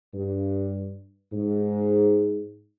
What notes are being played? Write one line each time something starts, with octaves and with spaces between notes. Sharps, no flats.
G2
G#2